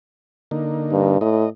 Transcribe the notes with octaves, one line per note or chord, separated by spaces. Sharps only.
D3 A#3 D#4
G2
A2 D#5